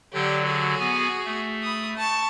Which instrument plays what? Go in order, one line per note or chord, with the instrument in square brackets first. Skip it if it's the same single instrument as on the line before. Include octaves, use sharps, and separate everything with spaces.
[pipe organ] D3 F#3 [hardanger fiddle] G4 D5
[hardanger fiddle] F#4 G#4
[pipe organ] B3 G#5
A3
[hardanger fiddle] B5 D#6
A5 C#6